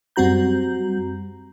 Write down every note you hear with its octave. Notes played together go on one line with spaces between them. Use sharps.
F#2 G3 C4 F#4 A#5 G6